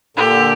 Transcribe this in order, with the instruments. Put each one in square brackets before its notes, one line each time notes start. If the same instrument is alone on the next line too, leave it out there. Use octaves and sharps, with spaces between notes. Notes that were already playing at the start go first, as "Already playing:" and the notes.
[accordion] A#2 D3 [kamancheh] G4